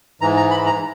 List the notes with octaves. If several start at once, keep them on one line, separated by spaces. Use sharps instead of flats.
G#2 E3 A#5
A#5
B5
A#5